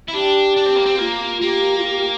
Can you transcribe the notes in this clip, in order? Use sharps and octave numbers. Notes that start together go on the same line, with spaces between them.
E4
D4 G4
D4
C4
A#3
C4
A#3 F4
A#3 G4
F4
G4
G4